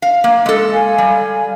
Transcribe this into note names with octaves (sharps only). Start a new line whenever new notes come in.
F5
A#3
G#3 A4
F5 G#5
G3